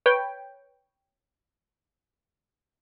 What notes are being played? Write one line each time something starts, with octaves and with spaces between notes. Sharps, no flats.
B4 C#5 G5